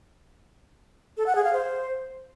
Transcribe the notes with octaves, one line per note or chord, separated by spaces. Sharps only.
A4
F#5
G#4
F5
C5